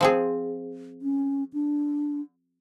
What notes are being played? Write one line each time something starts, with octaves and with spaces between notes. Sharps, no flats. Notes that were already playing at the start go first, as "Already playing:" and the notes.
F3 C4 G#4
C#4
D4